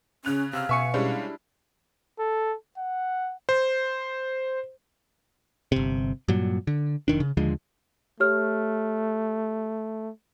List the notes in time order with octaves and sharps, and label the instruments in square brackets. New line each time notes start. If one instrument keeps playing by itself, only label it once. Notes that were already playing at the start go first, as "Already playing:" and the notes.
[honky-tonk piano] C#3 F#6 F7 [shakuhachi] C#4
[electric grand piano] C3 E6 F6 [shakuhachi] F5
[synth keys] B2 C#6 C#7 [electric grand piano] E5 G#5
[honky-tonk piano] G3 G#3 C#4 [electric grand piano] D4 E4
[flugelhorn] A4
F#5
[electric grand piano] C5
[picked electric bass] G1 C3
G2 A#2 F#3
D3
F1 D#3 D4
C#3
D#2 D3 F3 G#3
[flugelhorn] A3 [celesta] G4 C#5 F6